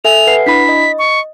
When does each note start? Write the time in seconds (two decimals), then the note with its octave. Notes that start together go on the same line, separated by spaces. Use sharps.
0.05 A4 E5 G#5 F7
0.27 B4 F#5 C7
0.46 D4 E4 B5 B6
0.69 D#5
0.99 C#6